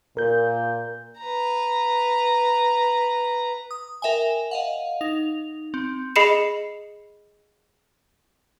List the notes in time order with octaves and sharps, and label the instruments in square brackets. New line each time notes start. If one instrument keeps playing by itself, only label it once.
[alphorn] A#2 [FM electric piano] A#4 G6
[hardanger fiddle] B4 A#5
[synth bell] D#6
A#4 E5 G5 G#5
D#5 F5 F#5
D#4 F7
C4
[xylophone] G#4 D#5 B5 C7 C#7 E7